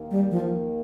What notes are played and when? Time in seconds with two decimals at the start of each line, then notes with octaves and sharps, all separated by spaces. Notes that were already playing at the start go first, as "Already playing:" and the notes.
Already playing: D#2 D#3 A#3
0.11 G3
0.31 F3